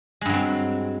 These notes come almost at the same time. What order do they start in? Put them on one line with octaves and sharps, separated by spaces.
G#3 G2 F#3 C4